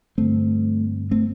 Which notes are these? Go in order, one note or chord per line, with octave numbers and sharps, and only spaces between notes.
G2 D3 A3 C4
A3 C4